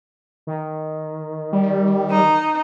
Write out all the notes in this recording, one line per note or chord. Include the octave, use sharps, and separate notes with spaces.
D#3
G3
D#4